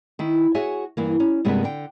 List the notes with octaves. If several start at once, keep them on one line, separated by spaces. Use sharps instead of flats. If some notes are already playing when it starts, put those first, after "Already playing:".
D#3 E4
F#4 G#4 C#5 E5 G#5
G2 E3 A#3
C#4
G2 C3 G#3 A#3 B3 B4
D3 G5